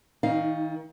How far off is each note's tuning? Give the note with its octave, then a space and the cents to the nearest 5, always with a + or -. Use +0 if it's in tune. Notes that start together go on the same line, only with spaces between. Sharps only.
D#3 +40 D#4 +0 F5 +0